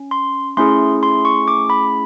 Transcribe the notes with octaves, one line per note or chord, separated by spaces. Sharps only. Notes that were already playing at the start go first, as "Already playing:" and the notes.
Already playing: C#4
C6
A3 C#4 E4 G#4 C6
C6
C#6
D6
B5